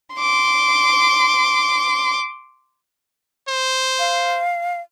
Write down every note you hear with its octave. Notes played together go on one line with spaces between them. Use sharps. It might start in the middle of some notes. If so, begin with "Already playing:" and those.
C6 D6
C5
F5